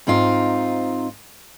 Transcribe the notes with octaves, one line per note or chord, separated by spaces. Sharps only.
G#2 C4 D#4 F4